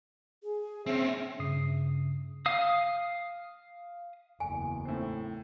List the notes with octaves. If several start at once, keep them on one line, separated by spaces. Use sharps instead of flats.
G#4
C4 C#4 E5
G2 C#3 D#6 C7
F5 D#6
F#1 E2 G#5
A2 C4